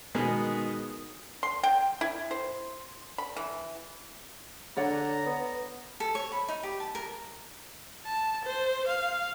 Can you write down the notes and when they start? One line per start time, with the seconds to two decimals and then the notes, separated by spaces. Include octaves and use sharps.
0.15 B2 D#3 G#3 B3 A#4 B4
1.43 C6
1.64 G5
2.01 E4
2.31 C5
3.18 B5
3.37 E3
4.77 D3 C#5 D5 F#5 A#5
5.26 B3
6.00 A4
6.15 C#5
6.32 B5
6.48 D#4
6.63 G4
6.80 A5
6.95 A#4
8.05 A5
8.45 C5
8.88 F5